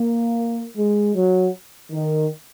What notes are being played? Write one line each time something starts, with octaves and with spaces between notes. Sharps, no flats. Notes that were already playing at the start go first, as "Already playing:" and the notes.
Already playing: A#3
G#3
F#3
D#3